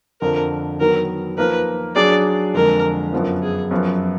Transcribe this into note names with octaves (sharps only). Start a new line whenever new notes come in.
F2 D3 F3 A#4
D#3 F#3 B3 A#4
F3 A#3 D#4 A#4 B4
F#3 D4 G#4 D5
F2 D3 G#3 A#4
F#2 F3 B3
G#4
F#2 F3 B3